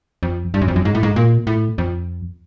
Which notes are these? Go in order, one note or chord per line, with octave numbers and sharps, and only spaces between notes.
F2
G2
F#2
F2
F#2
G#2
A2
G#2
A#2
A2
F2